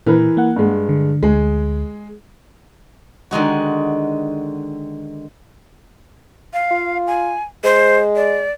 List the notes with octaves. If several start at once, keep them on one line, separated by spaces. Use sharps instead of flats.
A#2 E3 A#4 B4
A#3 F#5
G2 G#3
D3
D2 G#3 G#4
D3 D#3 G#3 F#4
F5
F4
G#5
G#3 C5
D5